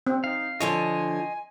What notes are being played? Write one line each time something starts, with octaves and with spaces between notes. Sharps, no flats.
C4
D#4 F5
D3 F3 C#5 D#5 G#5 C6